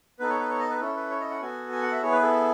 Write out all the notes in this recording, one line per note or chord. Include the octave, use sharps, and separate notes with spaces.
B3 D#4 A4 B4
C#5
B4
C#5
D#5
B4
C#4 E4 A4
B4
C#5
D#5
F#5
B3 F#4 A4 G#5
G#5
F#5
E5
B3 E4 G#4 C#5
B4
A4